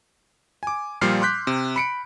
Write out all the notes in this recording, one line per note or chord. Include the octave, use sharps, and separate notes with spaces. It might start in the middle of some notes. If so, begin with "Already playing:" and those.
G#5 D6
A#2 F3 G3 F6 C7
C6 D6 F#6 G6 B6
C3
B5 C#7 D7